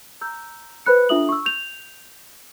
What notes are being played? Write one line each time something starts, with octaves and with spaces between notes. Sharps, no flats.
A#5 E6 G6
B4 C5 B5 F#6 C#7
D4 F4 A4 E5 D#6 F#7
C#6 E6
G6 F7